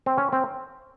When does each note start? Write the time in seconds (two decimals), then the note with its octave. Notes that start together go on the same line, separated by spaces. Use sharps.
0.06 C4
0.17 C#4
0.33 C4